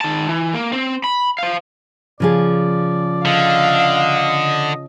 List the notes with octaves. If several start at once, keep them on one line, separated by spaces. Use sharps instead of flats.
D#3 A5
E3
A#3
C4
B5
C5 F5
C#3 F3 G#4 D5
D3 D#5 F5